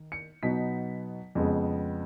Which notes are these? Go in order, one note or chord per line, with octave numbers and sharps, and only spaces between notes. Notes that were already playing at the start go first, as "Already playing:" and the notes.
Already playing: D#3
C#7
B2 F#3 B3 D#4 B6
F2 C#3 G#3 B3